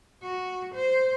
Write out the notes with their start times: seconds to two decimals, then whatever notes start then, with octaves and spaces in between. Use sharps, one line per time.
0.23 F#4
0.74 C5